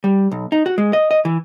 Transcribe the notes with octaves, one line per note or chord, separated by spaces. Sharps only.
G3
B1
D#4
F#4
G#3
D#5
D#5
E3